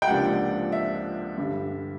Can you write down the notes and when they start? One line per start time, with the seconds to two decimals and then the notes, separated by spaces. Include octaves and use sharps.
0.02 G5
0.07 C#2 C3 F3 A#3 D4 F#5
0.72 E5
1.38 G2 D3 G3